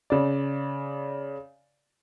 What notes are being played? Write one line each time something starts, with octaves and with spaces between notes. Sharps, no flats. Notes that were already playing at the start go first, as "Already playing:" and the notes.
C#3 D5